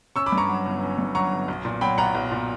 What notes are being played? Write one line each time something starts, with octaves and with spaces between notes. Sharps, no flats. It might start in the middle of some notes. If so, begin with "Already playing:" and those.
C#4 C#6 E6
B5 D6
G2
A#5 C#6
F#3
G1
C#4
G2
F#3 A#5 C#6
G1
B1
A#2
F#3 G5 B5
B1 F#5 A#5
B1
A#2